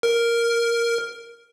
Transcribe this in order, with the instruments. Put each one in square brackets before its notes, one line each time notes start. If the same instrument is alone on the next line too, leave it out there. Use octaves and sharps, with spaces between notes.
[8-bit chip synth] A#4